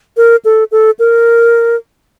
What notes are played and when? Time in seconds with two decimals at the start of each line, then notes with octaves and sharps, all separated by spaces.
0.17 A#4
0.45 A4
0.72 A4
0.99 A#4